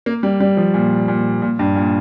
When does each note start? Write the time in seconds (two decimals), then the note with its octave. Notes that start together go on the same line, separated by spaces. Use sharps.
0.06 A#3
0.23 G3
0.40 G3
0.57 F3
0.74 A#2
1.08 A#2
1.42 A#2
1.59 G2
1.76 A#2